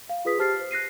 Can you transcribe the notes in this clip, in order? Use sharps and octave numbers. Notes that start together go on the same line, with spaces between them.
F5
F4 G#4 B4 D#6 B6
G4 C5 A5 F6 A6 C7
C5
F#6 A#6 C7 D#7